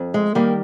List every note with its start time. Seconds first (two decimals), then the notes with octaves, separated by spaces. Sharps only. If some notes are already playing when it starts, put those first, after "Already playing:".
Already playing: F2
0.14 G#3
0.35 D#3 G3 A#3